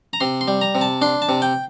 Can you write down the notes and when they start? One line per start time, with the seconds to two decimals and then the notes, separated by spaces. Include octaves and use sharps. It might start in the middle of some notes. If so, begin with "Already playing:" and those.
0.13 A#5
0.20 C3 C6
0.41 C6
0.48 G3
0.61 A#5
0.75 C3
0.81 A5
1.02 D4 C6
1.22 A5
1.29 C3
1.42 G5